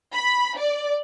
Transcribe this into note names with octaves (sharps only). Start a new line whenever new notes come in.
B5
D5